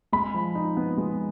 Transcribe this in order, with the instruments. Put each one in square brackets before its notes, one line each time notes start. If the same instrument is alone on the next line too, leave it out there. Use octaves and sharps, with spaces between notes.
[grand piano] G#3 B5
F3
D#4
B3
G#3